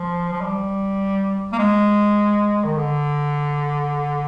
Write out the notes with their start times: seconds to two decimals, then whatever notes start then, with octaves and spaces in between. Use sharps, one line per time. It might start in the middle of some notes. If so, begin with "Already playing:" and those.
Already playing: F3
0.32 F3
0.41 G3
1.52 A#3
1.59 G#3
2.64 D#3
2.76 D3